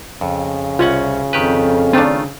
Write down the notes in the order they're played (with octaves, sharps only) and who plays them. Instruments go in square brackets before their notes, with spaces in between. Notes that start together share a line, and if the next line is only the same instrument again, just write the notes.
[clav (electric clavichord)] F2 [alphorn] C#3
[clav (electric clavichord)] C2 C#4 F#5 [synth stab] F4
[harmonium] F2 [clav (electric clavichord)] D#3 G4 B4
[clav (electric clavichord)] D#3 A3 F4 [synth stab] C4 D4